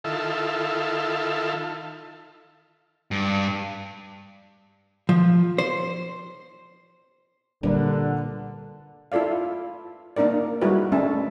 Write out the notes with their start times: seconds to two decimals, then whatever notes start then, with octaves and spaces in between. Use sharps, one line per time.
0.04 D#3 E4 F4 A4
3.11 G2
5.09 F3
5.58 C5
7.63 A#2 D3 G3 D4 A#4 B4 D5
9.12 E4 F4 A4 D5 F5
10.16 A#3 D4 D#4 A#4 D5
10.61 G3 G#3 E4 F#4 A#4 B4
10.92 G#3 A3 C#4 D4 E5 A5